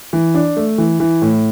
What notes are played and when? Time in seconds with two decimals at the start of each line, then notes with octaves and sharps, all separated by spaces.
0.13 E3
0.35 D4
0.57 A3
0.78 E3
1.00 E3
1.22 A2